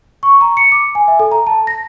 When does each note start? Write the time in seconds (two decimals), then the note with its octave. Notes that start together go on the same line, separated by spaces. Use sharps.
0.23 C#6
0.41 A#5
0.57 C#7
0.72 D6
0.95 G#5
1.08 E5
1.19 A4
1.31 A#5
1.47 A5
1.67 A#6